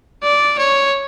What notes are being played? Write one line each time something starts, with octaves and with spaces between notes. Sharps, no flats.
D5
C#5